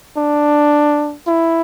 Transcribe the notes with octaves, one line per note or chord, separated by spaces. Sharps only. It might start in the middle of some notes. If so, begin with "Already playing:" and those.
D4
E4